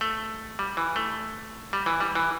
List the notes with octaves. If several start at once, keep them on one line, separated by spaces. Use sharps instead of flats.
A3
G3
E3
A3
G3
E3
G3
E3